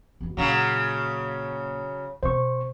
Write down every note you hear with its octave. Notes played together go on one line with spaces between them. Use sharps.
G1 F#2
A#2 C#3 F#3
B2 C5 C#6